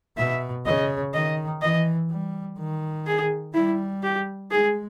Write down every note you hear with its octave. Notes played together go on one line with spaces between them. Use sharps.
B2 E5
C#3 D#5
D#3 D#5
E3 D#5
G3
D#3
G#4
G3 E4
G4
G#3 G#4